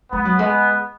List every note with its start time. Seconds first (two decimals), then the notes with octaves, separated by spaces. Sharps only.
0.12 G#3 B3
0.25 F#3
0.39 G#3